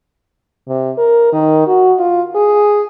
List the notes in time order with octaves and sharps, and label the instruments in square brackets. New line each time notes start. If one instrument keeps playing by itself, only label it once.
[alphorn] C3
A#4
D#3
F#4
F4
G#4